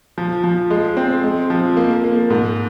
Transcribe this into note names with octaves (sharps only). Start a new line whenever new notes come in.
F3
F3
G#3
C4
G#3
F3
A#3
A#3
G#2